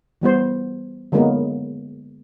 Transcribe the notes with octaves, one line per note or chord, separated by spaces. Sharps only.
E3 G3 B3 C5
D3 F#3 G#3 A#3 B3 D#4